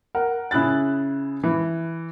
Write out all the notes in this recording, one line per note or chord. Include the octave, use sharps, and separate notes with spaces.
A#4 F#5
C#3 E4 G#4 F#6 A6
E3